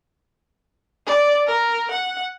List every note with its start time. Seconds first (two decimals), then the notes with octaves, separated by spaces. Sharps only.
1.06 D5
1.47 A#4
1.91 F#5